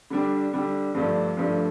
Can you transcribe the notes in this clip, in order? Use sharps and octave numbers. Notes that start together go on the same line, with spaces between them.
D3 G3 D4
D3 G3 D4
G2 D3 F3 A3 D4
G2 D3 F3 A3 D4